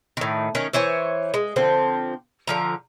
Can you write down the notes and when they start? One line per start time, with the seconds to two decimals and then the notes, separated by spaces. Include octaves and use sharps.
0.17 A2 D#3
0.55 D#3 C#4
0.73 E3 C5 C#5 G#5
1.34 G#3
1.56 D3 F3 C4
2.47 D3 F3 A#5